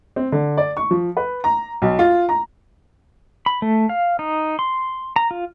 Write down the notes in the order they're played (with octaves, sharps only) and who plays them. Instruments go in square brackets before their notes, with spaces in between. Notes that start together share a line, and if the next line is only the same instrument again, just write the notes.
[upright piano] C4
D3
D5
C#6
F3
B4
A#5
B1
F4
A#5
[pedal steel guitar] B5
A3
F5
D#4
C6
A#5
F4